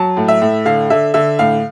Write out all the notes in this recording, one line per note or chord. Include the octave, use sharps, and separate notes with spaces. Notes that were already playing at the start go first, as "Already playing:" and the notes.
Already playing: F#3 A5
A2
E5
A2
D3 F5
D3 E5
D3 E5
A2 F5